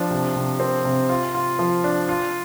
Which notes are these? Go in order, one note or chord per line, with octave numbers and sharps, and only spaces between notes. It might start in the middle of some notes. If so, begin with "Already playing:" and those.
Already playing: F3 D4
C3
C3
C4
C3
F4
F4
F3
D4
F4